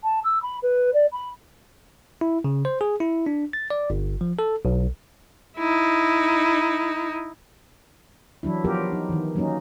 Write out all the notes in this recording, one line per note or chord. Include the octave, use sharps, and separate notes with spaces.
A5
E6
B5
B4
D5
B5
E4
C#3
C5
G#4
E4
D4
A6
D5
G1
F3
A4
B1
D#4 E4
E3 F#3 D4 E4
F3 F#3 B3 F4 G4 A#4
D#4
D#3 E3
F#3 A#3 C#4 D#4